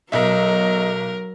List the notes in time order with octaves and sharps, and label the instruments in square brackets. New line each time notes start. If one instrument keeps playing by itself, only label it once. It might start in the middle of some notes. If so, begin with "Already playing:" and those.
[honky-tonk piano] B1 E5 [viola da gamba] F#3 [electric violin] A#4 [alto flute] D#5